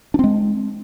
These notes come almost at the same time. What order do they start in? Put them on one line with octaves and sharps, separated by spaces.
D4 C4 G#3